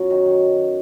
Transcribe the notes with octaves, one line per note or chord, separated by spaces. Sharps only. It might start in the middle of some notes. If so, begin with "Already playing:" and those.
Already playing: F#2 F#3
D#3
D#3